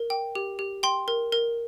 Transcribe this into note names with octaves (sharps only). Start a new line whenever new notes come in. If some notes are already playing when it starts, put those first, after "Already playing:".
Already playing: A#4
G5
G4
G4
G5 C6
A#4
A#4